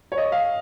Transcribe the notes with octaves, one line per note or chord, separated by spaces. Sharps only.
C#5
D#5
F5